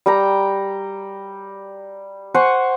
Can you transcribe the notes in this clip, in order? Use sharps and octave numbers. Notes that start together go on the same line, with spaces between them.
G3 G5 A#5
C5 F#5 G#5 C#6